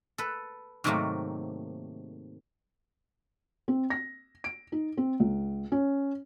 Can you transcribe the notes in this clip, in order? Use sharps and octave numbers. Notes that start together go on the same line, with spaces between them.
A4 B4
G#2 C3 D#3 F#3 A3 A#3
C4
A#6
D7
D#4
C4
C#2
C#4